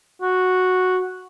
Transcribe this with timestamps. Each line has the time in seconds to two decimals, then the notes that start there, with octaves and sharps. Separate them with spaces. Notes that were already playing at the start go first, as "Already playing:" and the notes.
0.22 F#4